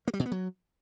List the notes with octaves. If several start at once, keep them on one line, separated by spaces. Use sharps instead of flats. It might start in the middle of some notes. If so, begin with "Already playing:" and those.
A#3
G3
B2
B3
F#3